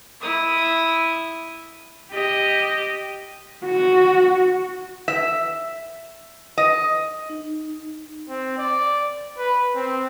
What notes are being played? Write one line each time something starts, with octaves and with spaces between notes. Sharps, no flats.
E4 D#6
G4 D#5
F#4
E5
D#5
D#4
C4
D5
B4
C4